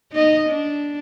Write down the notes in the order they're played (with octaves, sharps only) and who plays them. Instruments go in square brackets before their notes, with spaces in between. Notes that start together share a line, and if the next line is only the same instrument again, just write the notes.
[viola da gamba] D#4 D#5
D4